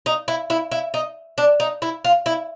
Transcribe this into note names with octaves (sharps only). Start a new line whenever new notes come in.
D#4
E4
E4
E4
D#4
D4
D#4
E4
F4
E4